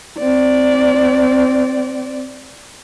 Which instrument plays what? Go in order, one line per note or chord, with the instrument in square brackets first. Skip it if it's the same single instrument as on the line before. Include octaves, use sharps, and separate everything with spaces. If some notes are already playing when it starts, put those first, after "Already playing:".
[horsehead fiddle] C4 D5